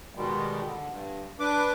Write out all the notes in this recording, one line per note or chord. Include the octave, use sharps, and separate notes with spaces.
B2 D#3 G3 G#3
D3
G2
D4 B4 D6